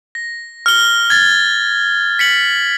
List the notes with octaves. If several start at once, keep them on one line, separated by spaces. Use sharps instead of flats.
A#6
F6 G7
G#6 A6
B6 C#7 F#7